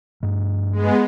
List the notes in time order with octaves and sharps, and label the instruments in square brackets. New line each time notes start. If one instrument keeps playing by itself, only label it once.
[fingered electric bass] G2 A3
[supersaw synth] G#3 B3